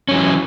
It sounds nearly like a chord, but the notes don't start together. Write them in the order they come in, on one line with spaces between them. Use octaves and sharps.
C#4 F#3 E3